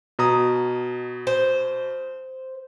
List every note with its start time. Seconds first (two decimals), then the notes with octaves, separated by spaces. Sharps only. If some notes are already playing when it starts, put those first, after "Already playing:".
0.19 B2 A#5 D#6
1.27 C5